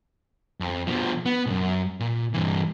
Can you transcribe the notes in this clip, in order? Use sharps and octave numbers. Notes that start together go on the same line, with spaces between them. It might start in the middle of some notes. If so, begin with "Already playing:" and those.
F2
B2 F3
B3
B1 F#2
A#2
G2 E3